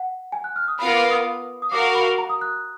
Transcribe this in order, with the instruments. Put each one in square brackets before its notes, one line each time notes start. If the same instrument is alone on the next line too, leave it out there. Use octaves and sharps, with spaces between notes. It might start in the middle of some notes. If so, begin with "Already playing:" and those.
Already playing: [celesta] F#5
G#5
F#6
F6
D#6
[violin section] B3 F4 A#4 F5 [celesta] B5
[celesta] D6
D#6
D#6
[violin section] F#4 A#4 F5 [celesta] D6
[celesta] B5
A#5
D#6
F#6